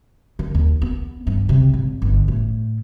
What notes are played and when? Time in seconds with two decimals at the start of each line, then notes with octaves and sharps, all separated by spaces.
0.39 D#3
0.55 D#2
0.82 B3
1.27 G2
1.49 C3
1.73 G#1
2.02 G1
2.28 A2